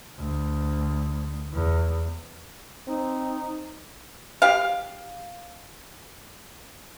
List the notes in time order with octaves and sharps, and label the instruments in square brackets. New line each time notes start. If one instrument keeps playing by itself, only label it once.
[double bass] D2
E2
[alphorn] C4 [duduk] D#4
[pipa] G4 F5